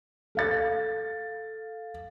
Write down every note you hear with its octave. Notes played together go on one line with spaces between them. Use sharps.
A4 F5 A6